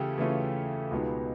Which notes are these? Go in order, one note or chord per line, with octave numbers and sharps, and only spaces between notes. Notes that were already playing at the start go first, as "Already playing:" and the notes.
Already playing: C#3 E3 A3 C#4 F4 G4 A4
C#3 E3 A3 C#4 F4
C#2 B2 G#3 B3 D#4